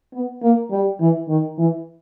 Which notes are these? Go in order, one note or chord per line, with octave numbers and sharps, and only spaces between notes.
B3
A#3
G3
E3
D#3
E3